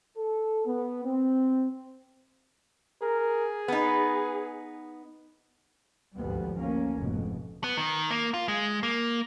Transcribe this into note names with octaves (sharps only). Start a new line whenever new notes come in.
A4
B3
C4
G#4 A#4
B3 D#4 B4
G#1 D2 G2 F3 G3 B3
D2 A#3 C#4
F1 G#2 B2
B3
D#3
A#3
F4
G#3
A#3